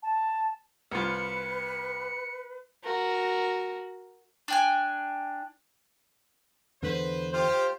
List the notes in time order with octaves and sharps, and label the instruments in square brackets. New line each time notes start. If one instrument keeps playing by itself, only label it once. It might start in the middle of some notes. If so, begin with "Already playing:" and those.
[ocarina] A5
[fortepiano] C2 F4 [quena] B4 [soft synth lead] C#7
[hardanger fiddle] F#4 A#4
[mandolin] D4 G5 G#5
[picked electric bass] E2 D3 [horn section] B4 C5
[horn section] F4 G4 [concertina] C5